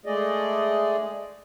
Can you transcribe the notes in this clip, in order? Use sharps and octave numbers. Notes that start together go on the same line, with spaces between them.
G#3 A3 G#4 D5 D#5